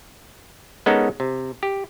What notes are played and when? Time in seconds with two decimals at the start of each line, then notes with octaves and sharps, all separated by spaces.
0.86 G#3 B3 C#4 D#4 A4 A#4
1.20 C3
1.63 G4